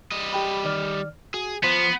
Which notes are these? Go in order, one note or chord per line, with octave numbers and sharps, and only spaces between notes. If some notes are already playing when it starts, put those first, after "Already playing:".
G3 D#5
G4 G5 B5
D#3 D5 F6
F#4 G#4
F3 B3 C5